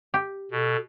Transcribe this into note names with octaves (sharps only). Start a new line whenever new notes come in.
G4
B2 A4